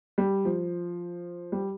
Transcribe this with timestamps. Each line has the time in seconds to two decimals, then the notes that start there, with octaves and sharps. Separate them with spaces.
0.18 G3
0.45 F3
1.52 G3